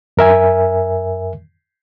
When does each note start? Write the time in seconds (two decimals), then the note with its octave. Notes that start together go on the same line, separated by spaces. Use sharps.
0.17 F#2 A#4 E5 G#5